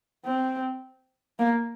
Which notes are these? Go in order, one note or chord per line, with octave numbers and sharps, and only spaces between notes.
C4
A#3